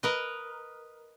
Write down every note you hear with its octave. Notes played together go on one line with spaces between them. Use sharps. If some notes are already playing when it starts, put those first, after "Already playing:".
A#4 B4 D#5